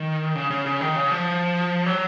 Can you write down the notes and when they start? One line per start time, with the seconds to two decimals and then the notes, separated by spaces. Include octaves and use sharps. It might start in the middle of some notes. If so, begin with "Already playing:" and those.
Already playing: D#3
0.35 C#3
0.50 C#3
0.66 C#3
0.81 D#3
0.96 C#3
1.11 F3
1.86 F#3